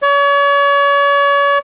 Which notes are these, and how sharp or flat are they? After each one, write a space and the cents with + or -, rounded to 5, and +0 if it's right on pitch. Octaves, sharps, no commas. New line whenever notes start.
C#5 +40